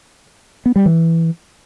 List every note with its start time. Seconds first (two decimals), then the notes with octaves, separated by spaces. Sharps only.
0.66 B3
0.76 G3
0.86 E3